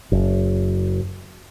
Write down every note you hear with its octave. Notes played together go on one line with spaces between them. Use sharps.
F#1